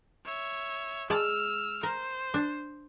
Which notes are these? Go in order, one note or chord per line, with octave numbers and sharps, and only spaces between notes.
C#5 E5
G#3 D5 A5 E6 F6
A#4 C5
D4